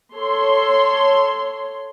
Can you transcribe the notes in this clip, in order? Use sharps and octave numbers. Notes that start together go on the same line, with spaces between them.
A4 C#5 C6